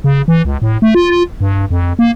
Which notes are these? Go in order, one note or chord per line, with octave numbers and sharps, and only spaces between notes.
C#3
E3
C#2
A2
A3
F4
G2
F2
A#3